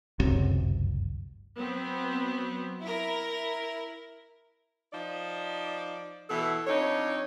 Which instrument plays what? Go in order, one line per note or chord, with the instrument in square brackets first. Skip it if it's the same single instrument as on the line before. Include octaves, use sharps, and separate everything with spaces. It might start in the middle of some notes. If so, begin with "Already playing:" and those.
[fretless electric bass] G1 C#2 F#2 C3
[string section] F#3 B3 C4
E4 A#4
[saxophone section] F3 D#4 D5
[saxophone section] B2 E3 [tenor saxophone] A4
[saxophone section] F2 D4 D#4 [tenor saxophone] C#5